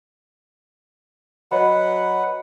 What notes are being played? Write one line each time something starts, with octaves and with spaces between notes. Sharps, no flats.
F#3 B4 C#5 D#5 F#5 B5